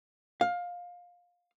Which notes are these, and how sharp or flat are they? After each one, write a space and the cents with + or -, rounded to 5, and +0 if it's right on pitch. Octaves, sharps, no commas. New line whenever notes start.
F5 +20